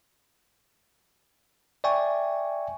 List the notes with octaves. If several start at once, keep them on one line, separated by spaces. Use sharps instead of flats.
D5 E5 G5 G#5 C#6